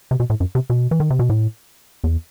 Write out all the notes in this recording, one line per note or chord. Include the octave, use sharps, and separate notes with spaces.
C3
B2
A2
F#2
C3
B2
E3
D#3
C3
B2
A2
E2